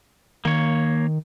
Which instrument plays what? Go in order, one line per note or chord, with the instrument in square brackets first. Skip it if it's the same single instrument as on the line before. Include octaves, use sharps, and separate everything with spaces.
[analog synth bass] D#3 [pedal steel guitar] A#3 C#5